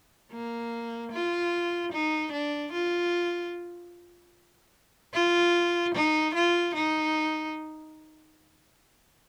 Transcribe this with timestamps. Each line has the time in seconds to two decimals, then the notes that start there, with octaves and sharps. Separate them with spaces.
0.32 A#3
1.12 F4
1.92 D#4
2.32 D4
2.72 F4
5.14 F4
5.95 D#4
6.35 F4
6.75 D#4